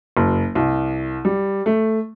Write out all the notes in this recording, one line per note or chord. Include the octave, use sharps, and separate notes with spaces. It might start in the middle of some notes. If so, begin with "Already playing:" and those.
F#1
C2
G3
A3